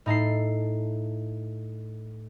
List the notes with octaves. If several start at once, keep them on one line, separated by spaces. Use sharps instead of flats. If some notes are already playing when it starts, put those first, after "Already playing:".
A2 D#4 A4 C7